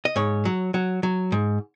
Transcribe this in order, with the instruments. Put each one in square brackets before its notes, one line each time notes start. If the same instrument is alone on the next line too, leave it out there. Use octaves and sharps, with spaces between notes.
[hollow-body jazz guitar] D#5
G#2 C#5
F#3
F#3
F#3
G#2